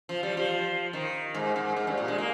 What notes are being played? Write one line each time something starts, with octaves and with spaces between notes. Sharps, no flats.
F3
G3
F3
D#3
G#2
G#2
G#2
G2
A#2
G#3
A#3